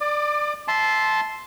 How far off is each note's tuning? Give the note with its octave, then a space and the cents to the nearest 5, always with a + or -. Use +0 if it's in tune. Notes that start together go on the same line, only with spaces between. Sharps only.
D5 +15 D6 +40
E5 +0 A5 -15 C6 +0